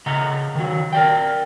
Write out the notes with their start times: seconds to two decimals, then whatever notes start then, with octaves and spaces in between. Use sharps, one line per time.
0.06 C#3 D#5 F#5 A#5
0.55 D#3 F#3
0.93 A#4 D5 G5